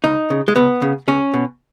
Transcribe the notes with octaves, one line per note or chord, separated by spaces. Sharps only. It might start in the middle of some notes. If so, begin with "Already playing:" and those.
C#2 D#4
C#3
G#3
C#2 B3
C#3
C#2 C#4
B2